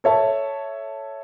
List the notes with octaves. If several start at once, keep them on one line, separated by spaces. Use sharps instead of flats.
A4 C#5 E5 A5